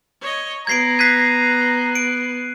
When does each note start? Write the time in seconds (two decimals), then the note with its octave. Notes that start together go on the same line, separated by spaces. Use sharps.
0.21 C#5 D#5
0.67 B3 A#5 G#6 C7 D7
0.99 F#6 G#6 B6 C7 D#7
1.95 D7